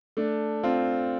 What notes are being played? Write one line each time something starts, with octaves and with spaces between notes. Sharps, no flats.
A3 D4
C4 F4